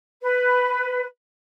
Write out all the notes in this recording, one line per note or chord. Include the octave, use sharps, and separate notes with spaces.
B4